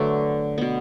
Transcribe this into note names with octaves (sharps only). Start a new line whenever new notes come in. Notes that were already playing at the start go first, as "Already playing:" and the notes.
Already playing: D3 F#3 A3 A4 B4 D5
B2 B3